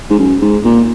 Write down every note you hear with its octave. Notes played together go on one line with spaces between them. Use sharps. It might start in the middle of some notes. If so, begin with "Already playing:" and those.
G#2
F#2
G#2
A#2